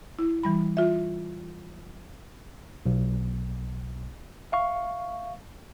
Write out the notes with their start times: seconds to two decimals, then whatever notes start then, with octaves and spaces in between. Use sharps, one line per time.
0.19 E4
0.43 E3 G3 B5
0.77 F4 E5
2.86 B1
4.52 E5 F5 C#6